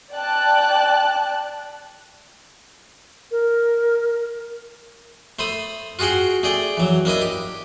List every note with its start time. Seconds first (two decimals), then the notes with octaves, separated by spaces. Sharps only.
0.14 D5 G5 A5 F#6
3.31 A#4
5.39 A3 C5 B5 D#6
5.99 F4 F#4 G#4 F#5 G5
6.43 A3 G#4 D5 G5
6.77 E3 F#3
7.05 A#3 D4 E4 D#5
7.21 G4